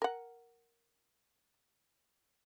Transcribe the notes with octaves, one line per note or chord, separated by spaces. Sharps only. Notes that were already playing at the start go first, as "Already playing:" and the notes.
A#4 F#5